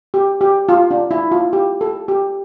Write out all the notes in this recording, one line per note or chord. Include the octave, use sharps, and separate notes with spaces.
G4
G4
F4
D4
E4
F4
G4
A4
G4